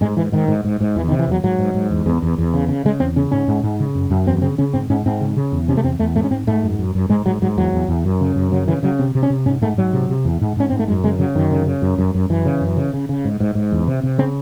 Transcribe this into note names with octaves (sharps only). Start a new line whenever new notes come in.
G#2 G#3
G#2 E3
G#2 D#3
G#2
G#2
G#2
E2 E3
D#3
C3
E3
E2 F#3
G#2 F#3
G#2
G#2
E2
E2
E2
E2
C#3
C#3
C#3 G#3
E2 C4
C#3 C#4
G#2 C#4
G#2
G#2
C#3
F#2
F#2
E2 C4
C#3 C4
C#3 C#4
G#2 C4
G#2 C#4
G#2 C4
C#3
C#3
E2
C3 C#4
A3
E2 C4
E2 A3
G#2 A3
C#4
G#2 C4
G#2 A3
F#2
F#2
F#2
G#2 G#3
G#2 F#3
G#2 F#3
E2 F#3
E2
E2
F#2
C#3
F#2
C#3 F#3
C#3 E3
C#3 F#3
C3 C4
C3
C#4
C3
G#2 C#4
G#2 A3
G#2 F#3
C3
C3
E2
G#2
G#2 C#4
G#2 C4
A3
F#2 G#3
C#3 G#3
C#3 F#3
F#2 D#3
C#3
C#3
F#2
F#2
F#2
F#2 E3
C#3
F#2
C#3
C#3
C#3
G#2
G#2
G#2
E2
C3
C3
C#3 C4